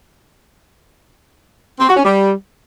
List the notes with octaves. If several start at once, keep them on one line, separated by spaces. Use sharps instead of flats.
C4
F#4
C#4
G3